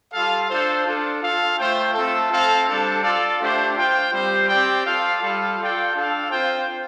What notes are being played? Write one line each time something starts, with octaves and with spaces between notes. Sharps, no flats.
G3 F4 A4 F5
D4 A4 C5
D4 F4 A4
F4 A4 F5
A3 F4 C5 G5
A3 C4 F4 A4
C4 A4 F5
G3 D4 A4 C5
F4 A4 D5 F5
A3 D4 G4 C5
F4 C5 G5
G3 C4 G4 C5
C4 G4 D5 G5
F4 A4 F5
G3 F4 A4 F5
F4 A4 D5 G5
D4 A4 F5
C4 F4 C5 G5